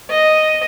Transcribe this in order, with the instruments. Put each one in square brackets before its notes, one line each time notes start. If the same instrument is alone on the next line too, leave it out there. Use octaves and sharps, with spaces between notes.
[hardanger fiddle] D#5